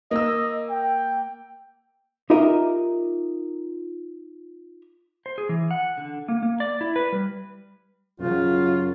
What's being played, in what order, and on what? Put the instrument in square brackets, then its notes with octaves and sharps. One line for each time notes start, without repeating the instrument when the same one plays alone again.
[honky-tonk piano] A#3 E6 [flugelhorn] D#5
[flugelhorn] G5
[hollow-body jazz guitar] D#4 F4 G4 A#4 D#5 E5
[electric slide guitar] C5
G#4
E3
F#5
D3
A#3
A#3
D5
E4
B4
G3
[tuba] F#2 [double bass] C#3 F#3 [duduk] F4